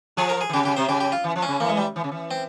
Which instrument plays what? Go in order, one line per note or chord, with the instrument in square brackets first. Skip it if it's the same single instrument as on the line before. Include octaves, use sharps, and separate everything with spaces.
[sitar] F3 [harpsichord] G#4
[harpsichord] A#4
G#4
[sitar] E3
[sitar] C#3 [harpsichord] G4
[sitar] C#3 [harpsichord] G4
[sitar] C3 [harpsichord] C5
[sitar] C#3 [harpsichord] G4
[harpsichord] G4
F4
[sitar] E3
F3
[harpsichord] C#4
[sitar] C#3
[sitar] E3 [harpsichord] A#3
[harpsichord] G#3
G3
[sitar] E3
C#3
E3
[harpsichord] C4